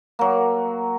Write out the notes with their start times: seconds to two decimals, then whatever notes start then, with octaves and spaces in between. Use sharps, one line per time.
0.19 F#3 A#3